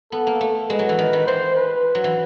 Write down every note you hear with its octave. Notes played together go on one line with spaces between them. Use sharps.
B3 A4
A#3
A3
G#3 B4
F#3
E3
D#3
D#3
E3 C5
B4
F#3
E3